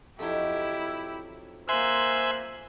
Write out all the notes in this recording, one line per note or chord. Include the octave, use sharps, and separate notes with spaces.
F2 F#3 D#4 E4 G4
A#3 C5 E5 G#5 C6 F#6